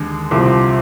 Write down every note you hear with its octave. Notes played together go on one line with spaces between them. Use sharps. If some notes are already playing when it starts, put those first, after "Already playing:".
Already playing: D#2 D3 G#3
C2 C3 F3